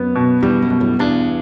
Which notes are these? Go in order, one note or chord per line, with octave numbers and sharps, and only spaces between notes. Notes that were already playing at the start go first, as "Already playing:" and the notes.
Already playing: F#2 B3
B2
E2 G2 G3
F#2
B2
F#2 A2
E2 G2 D4